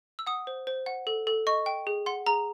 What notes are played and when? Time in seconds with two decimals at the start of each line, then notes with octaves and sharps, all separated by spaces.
0.19 E6
0.27 F#5 D#6
0.47 C5
0.67 C5
0.86 F#5
1.07 A4
1.27 A4
1.47 D#5 C#6
1.66 G5
1.87 G#4
2.06 F#5 C6
2.27 G#4 A#5